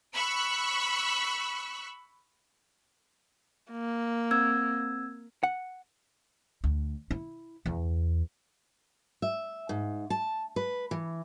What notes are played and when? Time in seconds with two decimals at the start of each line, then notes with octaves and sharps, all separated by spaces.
0.13 B5 C#6 E6 F#6
3.71 A#3
4.31 C4 E6 G#6
5.43 F#5
6.64 D2
7.11 E4
7.66 E2
9.22 E5
9.69 G#2
10.10 A5
10.56 B4
10.91 E3